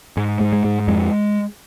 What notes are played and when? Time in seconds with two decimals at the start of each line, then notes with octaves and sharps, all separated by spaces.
0.17 G#2 G#3
0.41 G#2
0.52 G#3
0.64 G#2
0.88 F2 G#3